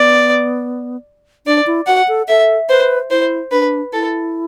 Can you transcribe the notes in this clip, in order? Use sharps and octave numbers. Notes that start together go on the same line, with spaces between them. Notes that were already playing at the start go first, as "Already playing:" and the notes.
Already playing: B3 D5
D4 D5
E4
F#4 F#5
A4
A4 E5
B4 C5
E4 C5
D4 B4
E4 A4